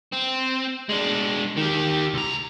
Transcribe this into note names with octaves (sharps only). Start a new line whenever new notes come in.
C4
G#3 D4
D#3 G4
C#2 A#5